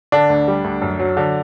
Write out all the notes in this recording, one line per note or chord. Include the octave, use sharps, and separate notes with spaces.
D3 D4
D2
G3
D2
F#2
F#3
D3